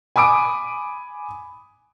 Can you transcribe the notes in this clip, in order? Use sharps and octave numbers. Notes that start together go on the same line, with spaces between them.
G#5 B5 D6 D#6 D7